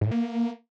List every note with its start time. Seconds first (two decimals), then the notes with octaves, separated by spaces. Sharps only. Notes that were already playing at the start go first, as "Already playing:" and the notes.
0.01 G#2
0.06 A2
0.11 A#3